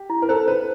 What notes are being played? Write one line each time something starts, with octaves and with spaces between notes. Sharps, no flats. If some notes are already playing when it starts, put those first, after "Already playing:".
Already playing: G4
E4
A#4
A4 C5
B4 C5